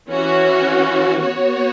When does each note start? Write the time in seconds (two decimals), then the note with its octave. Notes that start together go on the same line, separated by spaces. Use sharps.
0.10 E3 C#4 F#4
1.22 B3 F#4 C#5